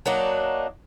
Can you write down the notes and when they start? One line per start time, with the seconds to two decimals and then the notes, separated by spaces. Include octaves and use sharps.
0.06 F#3 A#3 D4 D#4